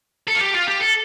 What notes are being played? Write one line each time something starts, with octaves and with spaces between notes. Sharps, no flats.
A4
F4
G4
F4
G4
A4